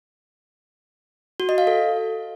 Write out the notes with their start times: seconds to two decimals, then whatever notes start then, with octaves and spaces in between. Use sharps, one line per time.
1.40 F#4
1.49 D#5
1.58 F5
1.67 A4